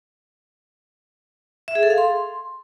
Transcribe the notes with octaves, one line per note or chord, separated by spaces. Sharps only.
E5
G#4
A4
F5
C6